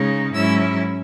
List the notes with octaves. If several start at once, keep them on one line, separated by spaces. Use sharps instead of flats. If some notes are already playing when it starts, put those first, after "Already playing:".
Already playing: C#3 G#3 D#4
G#2 F#3 C#4 E4 E6